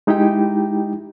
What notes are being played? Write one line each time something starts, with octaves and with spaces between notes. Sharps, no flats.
G#3 D#4 E4 G4 G5